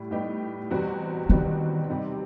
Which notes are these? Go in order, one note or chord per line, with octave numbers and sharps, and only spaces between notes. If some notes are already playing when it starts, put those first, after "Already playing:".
Already playing: A2 G3 G4
A2 G3 B3 D#4 G4
E2 B2 G3 C4 F#4
E2 B2 D#3 G3 C4 F#4
C3 D#3 G3 C4 D#4